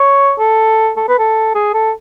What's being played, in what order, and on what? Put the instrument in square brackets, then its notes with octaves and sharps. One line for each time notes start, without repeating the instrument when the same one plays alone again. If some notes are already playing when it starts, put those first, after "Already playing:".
Already playing: [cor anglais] C#5
A4
A4
B4
A4
G#4
A4